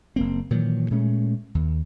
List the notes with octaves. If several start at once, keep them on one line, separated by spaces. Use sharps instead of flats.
F#1 A#3 C4
A#2 D#3 E3 F#3
A#2 G#3 A3 C#4
D#2